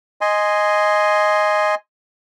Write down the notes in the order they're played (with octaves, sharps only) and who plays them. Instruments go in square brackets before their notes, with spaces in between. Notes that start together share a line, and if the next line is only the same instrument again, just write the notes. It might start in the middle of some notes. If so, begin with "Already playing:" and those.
[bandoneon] D#5 G#5 C6